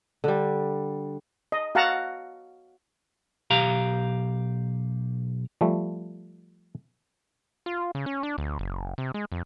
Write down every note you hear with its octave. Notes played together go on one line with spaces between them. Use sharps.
D3 G3
D#5
F#4 F5 F#5 A5 A#5
B1 G4 F5 A#5
F3 G3 A3
F4
C#3
C#4
D4
D2
F#1
C3
G#3
F2